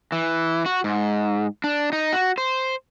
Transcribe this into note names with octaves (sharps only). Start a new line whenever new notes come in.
E3
F#4
G#2
D4
D#4
F#4
C5